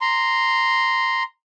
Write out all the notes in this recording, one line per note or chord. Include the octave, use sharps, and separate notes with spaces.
A#5 C6